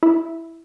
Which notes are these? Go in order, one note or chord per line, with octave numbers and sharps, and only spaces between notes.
E4